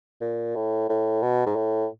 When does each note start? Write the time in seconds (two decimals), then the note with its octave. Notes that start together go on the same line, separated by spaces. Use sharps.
0.21 A#2
0.56 A2
0.90 A2
1.23 B2
1.46 G#2
1.56 A2